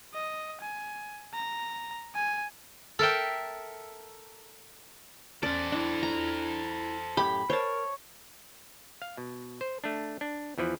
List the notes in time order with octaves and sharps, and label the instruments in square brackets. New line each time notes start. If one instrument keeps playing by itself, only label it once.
[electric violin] D#5
G#5
A#5
G#5
[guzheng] A4 A#4 E5 G5
[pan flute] C#4 [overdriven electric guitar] A4 C5 [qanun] D5
[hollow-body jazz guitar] D4 [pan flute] E4
[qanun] A#5
[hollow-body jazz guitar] F#2 A2 G4 [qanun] B5
[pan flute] A#4 [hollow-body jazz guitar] C5 A5 [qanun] C#5
[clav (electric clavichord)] F5
B2
C5
A3 D4
D4
E2 E3 F3 B4